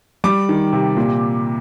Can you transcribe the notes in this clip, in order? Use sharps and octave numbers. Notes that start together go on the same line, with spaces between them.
G3 D6
D#3
C3
A#2